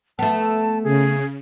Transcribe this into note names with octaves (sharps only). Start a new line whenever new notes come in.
A3 B3 A5
C#3 G#4